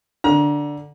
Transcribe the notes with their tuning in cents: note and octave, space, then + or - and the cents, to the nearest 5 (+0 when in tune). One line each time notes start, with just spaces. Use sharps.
D3 +0 A#5 +30